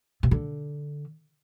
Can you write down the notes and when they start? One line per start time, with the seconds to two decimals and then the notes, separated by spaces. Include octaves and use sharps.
0.23 C3
0.31 D3